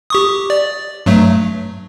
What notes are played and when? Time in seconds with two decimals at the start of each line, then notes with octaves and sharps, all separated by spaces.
0.10 G4 C#6 D#6
0.50 D5
1.06 G2 F#3 A3